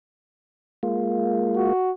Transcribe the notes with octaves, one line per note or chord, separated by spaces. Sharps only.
G#3 A#3 F4
F#4